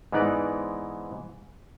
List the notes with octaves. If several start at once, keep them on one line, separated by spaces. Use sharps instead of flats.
G#2 E3 G#3 B3 D#4 D5